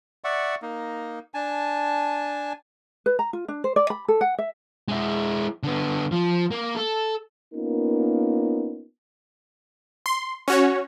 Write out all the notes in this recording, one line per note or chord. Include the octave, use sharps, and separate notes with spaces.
D5 E5 F#5 C#6
A#3 D#4
D4 G#5 A5
B4
A#5
F4
D4
C5
D5
B5
A4
F#5
E5
G#3 E4
D3 B3
F3
A#3
A4
A#3 B3 C#4 D#4 F4 A#4
C6
C#4 F#4 C#5